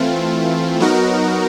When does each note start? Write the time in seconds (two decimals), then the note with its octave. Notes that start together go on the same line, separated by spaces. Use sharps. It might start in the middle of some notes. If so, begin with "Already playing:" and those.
Already playing: E3 A3 C4 F4
0.80 F#3 B3 D#4 F#4 A#4